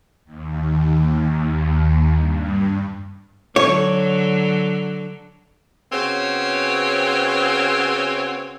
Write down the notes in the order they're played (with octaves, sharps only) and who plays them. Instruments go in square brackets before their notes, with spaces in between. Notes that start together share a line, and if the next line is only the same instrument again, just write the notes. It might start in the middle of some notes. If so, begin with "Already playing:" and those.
[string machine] D#2
G2
[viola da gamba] D3 F#3 [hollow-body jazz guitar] C#5
[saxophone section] C#3 B3 C4 F#4 C#5